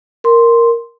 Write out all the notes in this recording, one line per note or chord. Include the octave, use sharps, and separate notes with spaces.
A#4 C6